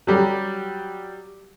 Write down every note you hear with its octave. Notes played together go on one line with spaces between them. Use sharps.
F#3 G3